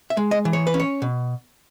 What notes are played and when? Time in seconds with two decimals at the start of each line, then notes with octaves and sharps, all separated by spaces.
0.10 E5
0.17 G#3
0.31 D#5
0.45 E3
0.53 C#5
0.67 B4
0.74 C#4
0.80 C#5
1.02 B2